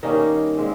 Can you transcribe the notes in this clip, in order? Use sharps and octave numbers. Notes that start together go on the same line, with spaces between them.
D#3 G3 A#3 C#4 D#4
A#2 F3 G#3 C4